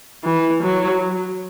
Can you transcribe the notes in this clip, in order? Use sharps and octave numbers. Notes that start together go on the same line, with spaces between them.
E3
F#3